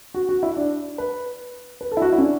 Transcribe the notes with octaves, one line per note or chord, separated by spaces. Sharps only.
F#4
F#4
E4
D4
B4
B4
A4
E4
F#4
E4
C#4
D4